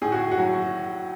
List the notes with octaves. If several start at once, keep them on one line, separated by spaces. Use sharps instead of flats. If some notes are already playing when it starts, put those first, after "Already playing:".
A2 G#4
F#4
F#4
F#3